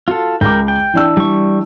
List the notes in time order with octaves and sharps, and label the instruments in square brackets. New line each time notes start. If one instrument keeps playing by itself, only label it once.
[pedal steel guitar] F4 A4 [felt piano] F#4
[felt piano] C#2 D6 [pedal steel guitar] A#4 G5
[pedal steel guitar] G5
[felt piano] E3 D4 E6
[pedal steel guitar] G3 C#6